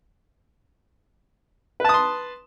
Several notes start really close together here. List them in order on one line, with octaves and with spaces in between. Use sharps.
B4 A5 D#6 C6